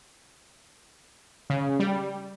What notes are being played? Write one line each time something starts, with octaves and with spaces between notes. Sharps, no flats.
C#3
G3